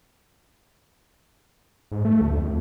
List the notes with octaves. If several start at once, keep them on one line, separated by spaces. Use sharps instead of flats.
G#2
A3
D2
F2